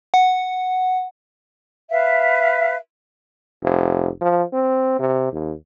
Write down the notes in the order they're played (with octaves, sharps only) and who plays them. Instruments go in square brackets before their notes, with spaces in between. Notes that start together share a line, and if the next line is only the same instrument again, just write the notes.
[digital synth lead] F#5
[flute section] B4 E5 F5
[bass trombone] F1
F3
C4
C3
D#2